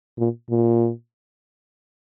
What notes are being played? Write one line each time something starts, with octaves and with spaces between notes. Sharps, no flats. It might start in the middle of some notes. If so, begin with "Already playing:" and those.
A#2
A#2